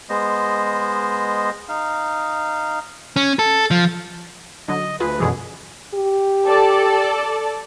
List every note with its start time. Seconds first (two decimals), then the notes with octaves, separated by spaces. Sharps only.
0.10 G#3 B3 C5 D#5
1.69 D#4 F5
3.16 C#4
3.39 A4
3.71 F3
4.68 D3 F#3 D#5
5.00 D2 F4 G#4 B4
5.20 F#2 B2 D3 E3 G#3 G#4
5.94 G4
6.48 A4 D5